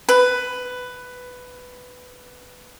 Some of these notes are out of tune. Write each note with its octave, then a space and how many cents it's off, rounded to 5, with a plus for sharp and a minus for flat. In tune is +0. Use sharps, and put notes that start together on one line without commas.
B4 +10